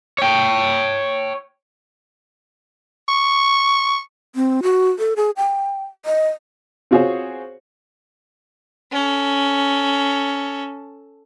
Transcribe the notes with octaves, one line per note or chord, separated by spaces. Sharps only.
C#5 G5
C#6
C4
F#4
A4
G#4
G5
D#5
C4 F4 F#4 G#4 C5 C#5
C#4 A4